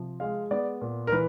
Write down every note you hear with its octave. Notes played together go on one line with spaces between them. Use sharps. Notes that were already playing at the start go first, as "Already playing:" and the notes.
Already playing: C3 F3
G#3 F5
B3 D5
A#2
A#4
E3 B4